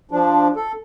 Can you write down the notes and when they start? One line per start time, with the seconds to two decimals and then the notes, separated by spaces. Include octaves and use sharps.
0.11 F3 D4
0.56 A4